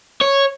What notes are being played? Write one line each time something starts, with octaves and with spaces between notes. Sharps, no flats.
C#5